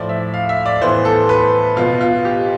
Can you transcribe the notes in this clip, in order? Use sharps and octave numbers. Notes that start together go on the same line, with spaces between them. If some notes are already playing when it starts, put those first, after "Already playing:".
Already playing: A2 F3 A3 D5
E5
F5
E5
D5
A2 E3 B3 C5
A4
B4
B2 B3 F4
F4
G4